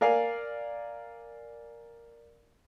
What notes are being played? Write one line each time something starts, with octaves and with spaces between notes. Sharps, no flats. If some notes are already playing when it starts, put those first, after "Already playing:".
A#4 D5 F5 G#5